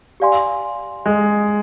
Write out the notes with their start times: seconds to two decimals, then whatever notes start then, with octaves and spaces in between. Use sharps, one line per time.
0.20 G4 D5 F5 G#5 C6
1.06 G#3